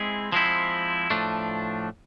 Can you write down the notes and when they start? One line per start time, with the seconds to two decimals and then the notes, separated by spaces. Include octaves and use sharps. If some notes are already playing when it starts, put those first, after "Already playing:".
Already playing: G#3 C4 E4 G#4
0.32 F3 G#3 C4 E4
1.10 A2 F3 A3 D4